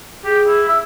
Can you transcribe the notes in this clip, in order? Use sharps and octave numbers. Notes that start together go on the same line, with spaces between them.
G4 G#4
E4
E5